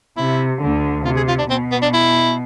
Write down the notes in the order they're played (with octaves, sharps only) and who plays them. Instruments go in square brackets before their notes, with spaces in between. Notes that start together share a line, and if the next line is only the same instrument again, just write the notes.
[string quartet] C3 [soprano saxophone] E4
[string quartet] D2 D3
[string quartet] C3 [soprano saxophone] F4
[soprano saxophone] G#4
F4
D4
[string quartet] B2 [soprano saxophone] C4
[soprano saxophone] B3
D4
E4